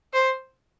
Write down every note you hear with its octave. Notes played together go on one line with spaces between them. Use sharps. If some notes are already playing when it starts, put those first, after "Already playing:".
C5